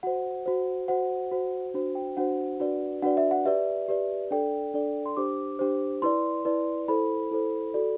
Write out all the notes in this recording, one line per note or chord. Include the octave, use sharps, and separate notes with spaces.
F#4 C5 F#5
F#4 C5
F#4 C5 F#5
F#4 C5
D4 F#4 C5
G5
D4 F#4 C5 F#5
D4 F#4 B4 D5
D4 F#4 B4 D5 F#5
E5
F#5
G4 B4 D5 E5
G4 B4 D5
D4 A4 D5 G5
D4 A4 D5
C6
D4 G4 C5 D6
D4 G4 C5
E4 B4 D5 C6
E4 B4 D5
E4 A4 C5 B5
E4 A4 C5
F#4 A4 D5